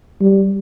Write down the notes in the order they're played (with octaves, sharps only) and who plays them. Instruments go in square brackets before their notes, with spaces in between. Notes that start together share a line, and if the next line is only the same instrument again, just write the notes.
[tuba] G3